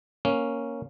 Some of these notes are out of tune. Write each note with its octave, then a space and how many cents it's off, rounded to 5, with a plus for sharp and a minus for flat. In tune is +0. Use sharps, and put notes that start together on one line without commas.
A#3 +5 C#4 +0